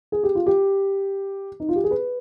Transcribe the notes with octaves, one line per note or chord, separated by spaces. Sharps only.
G#4
G4
F4
G4
D#4
F4
G4
G#4
B4